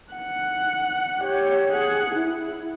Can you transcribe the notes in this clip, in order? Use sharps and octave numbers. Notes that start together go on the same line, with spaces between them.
F#5
G4 C#5
G#4 F#5
E4